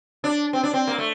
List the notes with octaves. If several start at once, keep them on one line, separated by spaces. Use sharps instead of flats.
D4
C4
D4
C4
A#3
A3